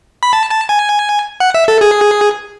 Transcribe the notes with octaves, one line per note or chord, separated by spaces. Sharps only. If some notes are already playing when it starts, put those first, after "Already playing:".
B5
A5
A5
G#5
F#5
E5
A4
G#4